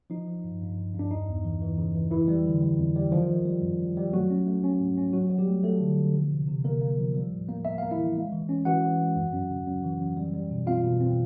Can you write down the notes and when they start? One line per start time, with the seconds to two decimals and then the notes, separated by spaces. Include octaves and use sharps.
0.10 F3 D#4
0.28 F3
0.44 G2
0.61 G2
0.78 G2
0.94 G2 D4
1.10 E2 D#4
1.28 E2
1.45 E3
1.62 E3
1.78 C#3
1.95 E3
2.11 F2 E3 E4
2.28 G3
2.46 D3
2.62 G3
2.79 F2
2.96 G3
3.12 D#3 F3 F4
3.29 D#3
3.45 G3
3.62 F#2
3.80 G3
3.97 G3
4.13 F#3 A3 F#4
4.30 C#4
4.47 A3
4.64 C#4
4.80 G#2
4.97 C#4
5.13 F#3 F#4
5.30 F#3
5.38 G3 G4
5.47 A3
5.63 F#3 A3 A4
5.80 D3
5.98 D3
6.14 F3
6.31 C3
6.48 C3
6.64 C3 A#3 A#4
6.81 A#3
6.98 F3
7.14 G3
7.32 A2
7.48 A#3
7.65 A#3 E5
7.78 A#3 F5
7.91 E4 E5
7.98 E3
8.16 G#3
8.32 E3
8.49 C#4
8.65 E3 F#4 F#5
8.82 E3
8.99 G#3
9.16 F#2
9.33 F#2
9.50 C#3
9.66 F#2
9.84 E3
10.01 F#2
10.17 G3
10.34 G3
10.50 B2
10.67 C4 F4 F5
10.84 B2
11.00 C4